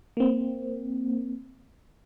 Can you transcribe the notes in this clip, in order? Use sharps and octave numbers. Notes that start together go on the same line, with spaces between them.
A#3 C4